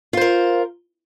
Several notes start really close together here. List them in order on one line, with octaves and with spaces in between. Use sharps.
F4 C5 A#4